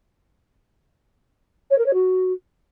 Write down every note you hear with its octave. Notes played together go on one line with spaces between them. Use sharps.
C#5
A#4
C#5
F#4